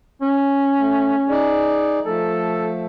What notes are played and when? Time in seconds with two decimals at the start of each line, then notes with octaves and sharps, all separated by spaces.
0.21 C#4
0.79 A3
1.30 D#4 G#4 D5
2.05 F3 A3 A4